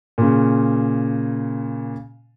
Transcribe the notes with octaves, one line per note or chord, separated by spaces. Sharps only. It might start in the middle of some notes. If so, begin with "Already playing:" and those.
A#2 C#3